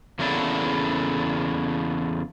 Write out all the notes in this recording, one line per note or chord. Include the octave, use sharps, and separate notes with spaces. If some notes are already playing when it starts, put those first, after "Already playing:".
E2 C#3 A#3 D4 E4 A4